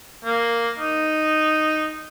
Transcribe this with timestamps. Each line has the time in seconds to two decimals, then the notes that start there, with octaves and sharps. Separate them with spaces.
0.24 A#3
0.79 D#4